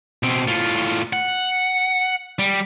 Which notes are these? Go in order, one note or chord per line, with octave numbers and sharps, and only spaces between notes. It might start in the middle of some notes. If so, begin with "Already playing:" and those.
B2 C4
A2 F4
F#5
G3